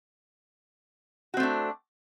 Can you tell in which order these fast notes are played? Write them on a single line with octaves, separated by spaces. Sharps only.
F#4 C4 A3 D4